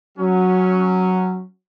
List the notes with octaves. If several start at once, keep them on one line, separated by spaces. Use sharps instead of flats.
F#3 C#4